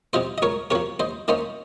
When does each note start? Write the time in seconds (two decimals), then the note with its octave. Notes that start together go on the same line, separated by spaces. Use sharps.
0.13 C3 F3 C5 D#5
0.38 D#5
0.42 C#2 A#4 C#5
0.71 C3 F3 A#4 C#5
1.00 D#2 C5 D#5
1.28 D#3 A#3 C#4 C5 D#5